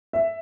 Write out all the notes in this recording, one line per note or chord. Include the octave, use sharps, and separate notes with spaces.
E5